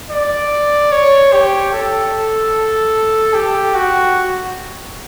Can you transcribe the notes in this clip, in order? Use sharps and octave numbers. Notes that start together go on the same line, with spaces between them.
D5
C#5
G4
A4
G4
F#4